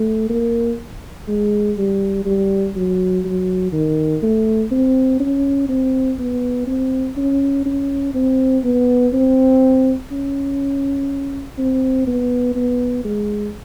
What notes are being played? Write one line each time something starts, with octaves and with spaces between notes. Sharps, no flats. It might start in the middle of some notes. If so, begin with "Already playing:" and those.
Already playing: A3
A#3
G#3
G3
G3
F#3
F#3
D#3
A3
C4
C#4
C4
B3
C4
C#4
C#4
C4
B3
C4
C#4
C4
B3
B3
G#3